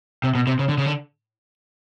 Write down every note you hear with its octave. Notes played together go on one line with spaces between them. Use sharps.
C3
B2
C3
C#3
D3
C#3
D3